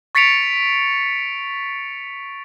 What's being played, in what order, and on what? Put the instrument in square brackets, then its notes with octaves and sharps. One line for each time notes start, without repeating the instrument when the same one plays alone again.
[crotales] C#6 A6 B6 C#7 D7 F7